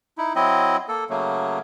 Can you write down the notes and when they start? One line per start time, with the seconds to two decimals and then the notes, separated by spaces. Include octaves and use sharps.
0.18 D#4 E4
0.36 F#3 C4 E4 D#5
0.88 A#3 A4
1.10 C#3 F#3 A3 A#3